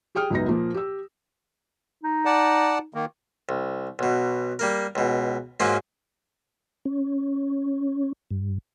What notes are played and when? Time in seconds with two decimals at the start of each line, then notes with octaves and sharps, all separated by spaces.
0.15 G4 G#4 G5 D#6 F6
0.30 C#2 F#2 B3 D#4 A#6
0.48 A#2 F3 A#3
0.74 G4 E6
2.03 D#4
2.25 D5 F#5 A5
2.94 D#3 A#3
3.49 C2
3.99 B1 B2
4.59 G3 A#3 A#4
4.95 C#2 B2
5.60 G#2 F#3 A#3 C#4 F4
6.85 C#4
8.31 G2